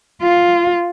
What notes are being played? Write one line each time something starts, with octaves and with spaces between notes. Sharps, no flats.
F4